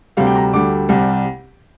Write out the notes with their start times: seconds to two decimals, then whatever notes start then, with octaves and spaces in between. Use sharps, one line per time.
0.17 D2 C3 G3 F5
0.27 G5
0.36 A#5
0.53 D2 D3 G3 D6
0.89 C2 C3 G3